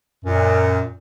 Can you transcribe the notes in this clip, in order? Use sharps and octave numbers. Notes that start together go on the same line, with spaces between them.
F#2 A#2